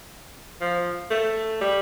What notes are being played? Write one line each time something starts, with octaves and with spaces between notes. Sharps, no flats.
F3
A3
G3